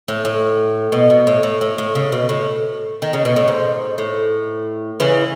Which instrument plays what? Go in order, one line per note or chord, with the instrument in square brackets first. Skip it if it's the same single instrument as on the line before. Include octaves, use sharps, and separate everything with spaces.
[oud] A2
A2
B2
B2
A2
A2
A2
A2
C#3
B2
A2
D#3
C#3
B2
A2
G#2
A2
C#3 E3